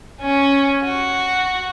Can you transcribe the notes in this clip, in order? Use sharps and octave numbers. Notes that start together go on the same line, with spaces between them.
C#4
F#4